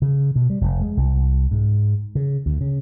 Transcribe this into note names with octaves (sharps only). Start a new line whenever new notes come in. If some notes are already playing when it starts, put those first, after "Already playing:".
C#3
B2
G3
F1
G#3
C2
G#2
C#3
D2
C#3